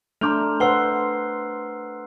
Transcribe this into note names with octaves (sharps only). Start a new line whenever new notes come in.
A3 D4 A#5 C6 D6 F6 G6 F7
B4 C5 F#5 E6 C7 G7